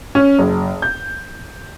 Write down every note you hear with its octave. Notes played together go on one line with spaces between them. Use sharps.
C#4
F#1
G6